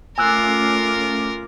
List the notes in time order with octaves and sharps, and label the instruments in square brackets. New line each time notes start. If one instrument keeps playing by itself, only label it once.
[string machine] A3 C#4 [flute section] F4 D6 [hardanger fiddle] A#4 [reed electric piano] G#5 E6 F#6